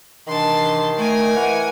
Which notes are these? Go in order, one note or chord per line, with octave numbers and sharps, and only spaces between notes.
C3 D#3 E3 D4 A5 C6
A3 A#4 G#5
E3 F#5